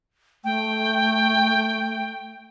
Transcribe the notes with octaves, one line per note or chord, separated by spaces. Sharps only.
A3 G5